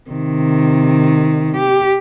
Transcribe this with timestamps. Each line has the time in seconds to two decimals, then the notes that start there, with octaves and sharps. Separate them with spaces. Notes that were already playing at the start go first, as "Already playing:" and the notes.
0.10 C3 D#3
1.57 G4